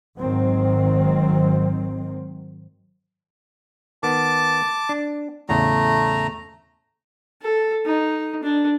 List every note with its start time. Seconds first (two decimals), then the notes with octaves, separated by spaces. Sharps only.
0.19 G#1 D#3 F#3 C4
4.03 D#3 B3 A5 D6
4.89 D4
5.49 E2 A2 C#3 A3 A#5
7.42 A4
7.85 D#4
8.43 D4